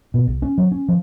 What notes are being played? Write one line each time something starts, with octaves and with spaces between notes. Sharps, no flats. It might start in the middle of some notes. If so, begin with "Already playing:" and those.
B2
C2
C#4
F#3
C#4
F3